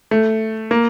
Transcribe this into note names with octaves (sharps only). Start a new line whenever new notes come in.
A3
A#3